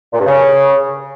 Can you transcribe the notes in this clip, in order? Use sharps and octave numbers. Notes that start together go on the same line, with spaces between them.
A#2
G2
C#3